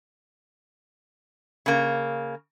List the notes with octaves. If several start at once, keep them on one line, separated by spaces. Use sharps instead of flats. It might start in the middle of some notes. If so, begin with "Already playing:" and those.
C#3 A#3